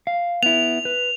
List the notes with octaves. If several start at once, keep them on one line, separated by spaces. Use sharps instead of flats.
F5
B3 E4 F7
B4